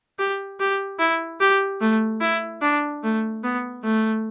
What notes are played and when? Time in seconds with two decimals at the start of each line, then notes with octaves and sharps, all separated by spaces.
0.19 G4
0.60 G4
0.99 E4
1.40 G4
1.81 A3
2.21 E4
2.62 D4
3.03 A3
3.44 B3
3.84 A3